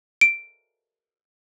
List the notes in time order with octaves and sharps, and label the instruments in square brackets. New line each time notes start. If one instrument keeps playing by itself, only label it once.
[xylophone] D7